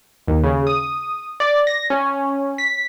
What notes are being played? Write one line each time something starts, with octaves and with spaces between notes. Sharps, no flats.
D#2
C#3
D#6
D5
A#6
C#4
B6